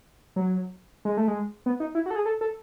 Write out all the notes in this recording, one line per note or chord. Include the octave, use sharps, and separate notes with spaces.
F#3
G#3
A3
G#3
B3
D#4
E4
F#4
A4
G#4
A4
A4